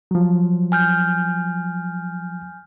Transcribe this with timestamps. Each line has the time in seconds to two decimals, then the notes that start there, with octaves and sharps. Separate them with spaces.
0.11 F3 F#3
0.72 G#5 F6 G6